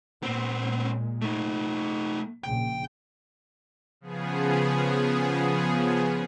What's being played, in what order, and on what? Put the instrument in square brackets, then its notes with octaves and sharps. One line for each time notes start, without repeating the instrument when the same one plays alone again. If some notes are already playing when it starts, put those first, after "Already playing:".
[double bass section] A#2 G#3 [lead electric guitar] B3 C4
[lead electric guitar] A3 D#4
[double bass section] A#1 C#3 [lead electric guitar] G5
[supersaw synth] C#3 F3 B3 G#4